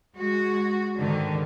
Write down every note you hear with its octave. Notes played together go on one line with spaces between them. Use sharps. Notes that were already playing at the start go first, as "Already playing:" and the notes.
G#3 F#4
G#2 D3 D#3